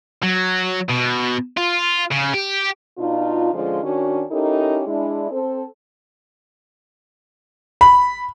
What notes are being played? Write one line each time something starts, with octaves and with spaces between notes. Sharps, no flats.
F#3
B2
F4
C#3
G4
B2 D4 D#4 F4
D3 F3 G#3 C#4 F4
D#3 C#4 D4 F#4
C#4 D#4 E4 G4 A4 A#4
G#3 D4 E4
C4 A4 C5
B5